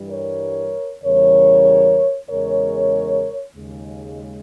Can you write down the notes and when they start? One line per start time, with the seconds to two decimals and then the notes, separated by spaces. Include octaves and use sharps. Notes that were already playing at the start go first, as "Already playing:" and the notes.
Already playing: G2 E3 G3
0.09 A#4 C#5
1.03 E2 C#3 E3 G3 A#4 C#5
2.29 E2 C#3 G#3 A#4 C#5
3.55 D#2 C#3 G#3